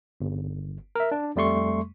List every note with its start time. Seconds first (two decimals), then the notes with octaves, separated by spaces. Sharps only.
0.21 G1
0.95 A#4 E5
1.11 D4
1.36 F2 G3 A3 C6 C#6